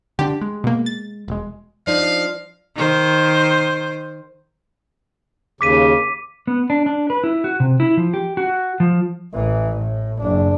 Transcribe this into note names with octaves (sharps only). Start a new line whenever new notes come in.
D3 D4 G4
G#3
B2 A#3
A6
E1 G#3
F3 D4 D#4 D5 F5
D#3 C5
D#2 C#3 D6 B6 D#7
B3
D4
D4
B4
E4
F#4
C3
E4
F3
G4
F#4
F3
A1 E3
A2
F#1 D4